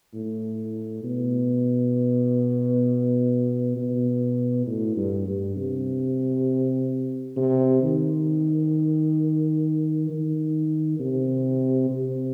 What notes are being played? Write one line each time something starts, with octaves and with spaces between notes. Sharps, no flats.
A2
B2
B2
A2
G2
G2
C3
C3
D#3
D#3
C3
C3